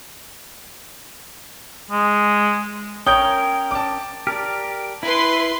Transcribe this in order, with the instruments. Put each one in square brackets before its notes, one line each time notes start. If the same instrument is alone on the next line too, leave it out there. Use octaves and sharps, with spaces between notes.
[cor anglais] G#3
[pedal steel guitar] C#4 A#4 [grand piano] C#5 G6 [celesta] G5 D#6 G7
[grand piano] A5 D6
[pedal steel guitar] G4 A#4 D5 [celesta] F6
[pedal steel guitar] E4 [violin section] B4 C6